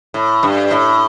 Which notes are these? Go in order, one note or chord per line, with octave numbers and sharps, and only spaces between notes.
A2
G2
A2